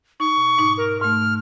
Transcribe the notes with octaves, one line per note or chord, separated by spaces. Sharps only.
D#4 C#6
B2
G#2 D#4 D6
A#4
G#2 A3 F6